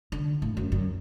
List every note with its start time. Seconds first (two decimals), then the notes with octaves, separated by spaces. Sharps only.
0.12 D3
0.42 A2
0.57 F#2
0.72 F#2